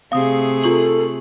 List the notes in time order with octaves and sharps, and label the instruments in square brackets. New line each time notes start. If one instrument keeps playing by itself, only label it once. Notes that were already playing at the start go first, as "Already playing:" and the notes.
[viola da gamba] C3 A3 G#4 [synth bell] F5 D#6
[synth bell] F4 C#6 F#7 [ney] A4